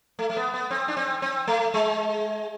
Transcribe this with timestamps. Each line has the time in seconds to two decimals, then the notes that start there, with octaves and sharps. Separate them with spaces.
0.19 A3
0.30 A3
0.37 B3
0.54 B3
0.70 C4
0.88 D4
0.97 C4
1.22 C4
1.47 A3
1.74 G#3